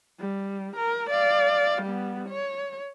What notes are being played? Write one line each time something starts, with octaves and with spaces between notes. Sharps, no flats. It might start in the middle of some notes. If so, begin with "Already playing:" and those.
G3
A#4
D5 F5
G3 B3
C#5